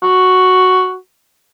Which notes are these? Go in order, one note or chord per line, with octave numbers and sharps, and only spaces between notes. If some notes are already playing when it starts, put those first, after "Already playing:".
F#4